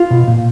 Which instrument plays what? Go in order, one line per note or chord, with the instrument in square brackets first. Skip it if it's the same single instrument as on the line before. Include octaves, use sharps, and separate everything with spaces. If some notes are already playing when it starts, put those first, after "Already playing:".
Already playing: [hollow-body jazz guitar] F4
B2
A#2